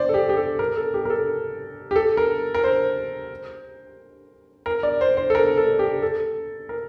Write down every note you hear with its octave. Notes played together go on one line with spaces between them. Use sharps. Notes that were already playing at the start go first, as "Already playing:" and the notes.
Already playing: C5 D5
A4
G4
G4
A4
A#4
A4
G4
A#4
A4
G4
A4
A#4
A#4
C5
A#4
D5
C5
C5
A4
A#4
A4
G4
A4
A#4